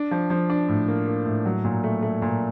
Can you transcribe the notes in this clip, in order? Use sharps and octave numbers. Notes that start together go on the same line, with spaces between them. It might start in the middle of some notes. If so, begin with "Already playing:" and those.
Already playing: D4
F3
F3
D4
A2
A#3
A#3
A2
F#3
A#2
A3
A3
A#2